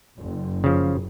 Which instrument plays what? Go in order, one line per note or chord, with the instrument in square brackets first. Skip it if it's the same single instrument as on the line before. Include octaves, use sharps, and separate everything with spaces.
[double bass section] F#1
[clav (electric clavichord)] C#3 F3